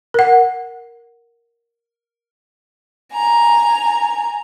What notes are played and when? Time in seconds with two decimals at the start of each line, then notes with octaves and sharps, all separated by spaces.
0.14 A#4 F#5
3.13 G#5 A#5